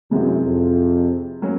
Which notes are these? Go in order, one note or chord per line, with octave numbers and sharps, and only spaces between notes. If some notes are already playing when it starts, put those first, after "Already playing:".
F#2 C3 E3 G#3
F2
F#3 A#3 C#4